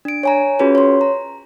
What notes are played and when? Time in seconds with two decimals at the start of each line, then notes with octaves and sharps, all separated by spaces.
0.05 D4 D7
0.23 C#5 G#5 A#5
0.59 C#4 F4 F#4 G#4 B4 C#5
0.75 C#5 C6
1.01 A#5